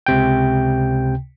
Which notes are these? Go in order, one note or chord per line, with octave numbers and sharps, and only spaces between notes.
C#2 C3 G5